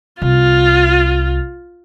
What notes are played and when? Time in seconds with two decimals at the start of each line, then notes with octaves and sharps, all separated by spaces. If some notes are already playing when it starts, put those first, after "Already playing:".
0.22 C2 F4